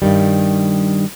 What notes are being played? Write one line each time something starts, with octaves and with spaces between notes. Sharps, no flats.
G2 D#3 G3